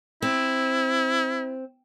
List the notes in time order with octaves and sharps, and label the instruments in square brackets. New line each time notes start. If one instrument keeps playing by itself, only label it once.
[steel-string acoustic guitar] C4 [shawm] E4